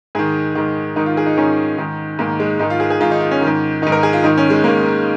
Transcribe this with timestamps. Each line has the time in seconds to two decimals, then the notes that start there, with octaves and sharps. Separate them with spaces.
0.15 G#2 D#3 G#4
0.55 G#2 D#3
0.96 G#2 D#3 D#4
1.06 F4
1.17 G#4
1.26 D#4
1.37 G#2 D#3 C#4
1.78 G#2 D#3
2.19 G#2 D#3 A#3
2.40 G#3
2.59 G#2 D#3 D#4
2.70 F4
2.80 G#4
2.90 G#4
3.00 G#2 F4
3.04 D#3
3.11 D#4
3.21 F4
3.31 C#4
3.41 D#3
3.46 G#2
3.82 D#3 D#4
3.87 G#2
3.92 A#4
4.03 G#4
4.13 F4
4.24 G#2 D#3 D#4
4.37 C#4
4.50 G#3
4.64 G#2 D#3 A#3